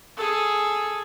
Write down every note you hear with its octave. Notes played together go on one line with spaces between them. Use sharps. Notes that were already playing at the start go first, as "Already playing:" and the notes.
G#4 A4